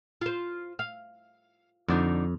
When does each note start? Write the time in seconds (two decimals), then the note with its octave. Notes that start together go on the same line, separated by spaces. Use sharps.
0.21 F4 C5
0.79 F5
1.88 F2 D3 D4 D#4